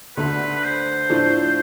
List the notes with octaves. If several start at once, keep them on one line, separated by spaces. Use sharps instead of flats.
D2 D3 A3 B4
B4
C5
A2 F3 A3 D4